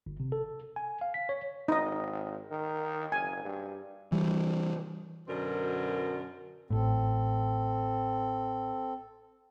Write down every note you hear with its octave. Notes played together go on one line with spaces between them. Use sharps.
G1
C3
A4
G#5
F5
B6
C#5
G#1 D#4 D#5
D#3
F#1 G#5
G2
E3 G3
F#2 B2 D3 A#4 C5
A1 A2 C4 A4